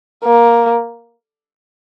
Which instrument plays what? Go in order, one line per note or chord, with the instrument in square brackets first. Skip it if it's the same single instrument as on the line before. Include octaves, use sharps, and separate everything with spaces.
[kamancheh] A#3